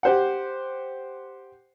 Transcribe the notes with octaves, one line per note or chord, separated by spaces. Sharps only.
G4 C5 F#5